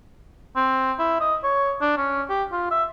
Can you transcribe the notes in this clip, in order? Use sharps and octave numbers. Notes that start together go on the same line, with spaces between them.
C4
E4
D#5
C#5
D4
C#4
G4
F4
E5